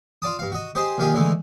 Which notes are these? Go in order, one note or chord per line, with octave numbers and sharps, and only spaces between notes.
F4 D5 A5 D#6
G2 F5
F#4 D#5
G4 G#4 C5 D#5
A#1 D#3 F4 G4 G#4
D3 E3 G#3 A3